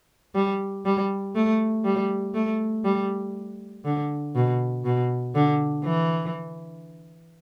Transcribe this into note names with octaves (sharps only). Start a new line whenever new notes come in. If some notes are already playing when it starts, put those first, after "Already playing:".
G3
G3
A3
G3
A3
G3
D3
B2
B2
D3
E3